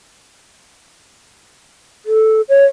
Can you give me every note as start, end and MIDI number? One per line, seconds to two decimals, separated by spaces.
2.06 2.41 69
2.49 2.65 73